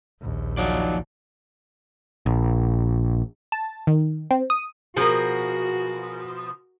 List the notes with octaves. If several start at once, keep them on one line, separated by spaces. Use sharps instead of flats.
A#1 D#2
F3 F#3 D#4 D5
A#1
A5
D#3
C4
D#6
B2 F3 F#4 G#4 A#4